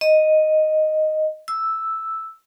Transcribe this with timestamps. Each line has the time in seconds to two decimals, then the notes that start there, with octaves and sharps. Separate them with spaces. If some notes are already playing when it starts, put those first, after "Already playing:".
0.01 D#5
1.48 E6